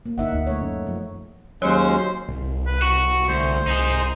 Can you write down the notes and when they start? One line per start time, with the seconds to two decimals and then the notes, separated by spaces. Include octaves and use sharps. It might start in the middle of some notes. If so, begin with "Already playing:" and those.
0.06 A#3
0.18 G1 D#4 E5 F#5
0.32 D2
0.47 A3 C#5
0.61 F#2
0.87 F3
1.62 D#2 F#3 G#3 C#4 C5 C6
2.29 C2
2.67 B4
2.82 F#4 C#6
3.29 D2 C5
3.67 C2 D#4 G#4